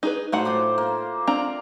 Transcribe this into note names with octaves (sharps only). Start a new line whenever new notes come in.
D#4 G#4 B4
A2 F#3 A3 D#4 C5 F#5
F4 C5 D6
A#3
C4 D4 F5 A#5